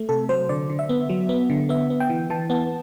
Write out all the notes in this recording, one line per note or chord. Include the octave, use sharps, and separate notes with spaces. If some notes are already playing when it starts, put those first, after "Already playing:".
Already playing: A3
C3 A4
F#3 C5
D3 D5
D3
E5
B3
F#3
B3
D3
B3 E5
B3
G5
E3
E3 A5
B3